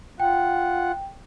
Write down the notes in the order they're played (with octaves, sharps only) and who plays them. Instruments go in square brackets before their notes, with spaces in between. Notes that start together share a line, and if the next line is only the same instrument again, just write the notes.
[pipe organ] F4 F#5 [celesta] G5